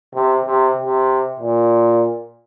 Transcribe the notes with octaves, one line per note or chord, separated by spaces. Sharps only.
C3
C3
C3
A#2